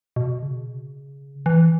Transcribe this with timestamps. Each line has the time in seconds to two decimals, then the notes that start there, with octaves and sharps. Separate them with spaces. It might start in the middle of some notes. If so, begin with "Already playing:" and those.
0.16 B2
0.42 C#3
1.46 E3